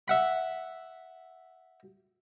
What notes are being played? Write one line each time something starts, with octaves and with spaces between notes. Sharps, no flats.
E5 F#5 B5